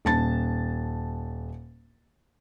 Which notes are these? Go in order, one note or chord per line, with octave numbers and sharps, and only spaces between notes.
D#1 A5 A6